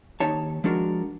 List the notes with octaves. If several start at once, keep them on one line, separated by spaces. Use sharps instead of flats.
D#2 D#4 C#5 A5
F3 G#3 D4 F#4 A#4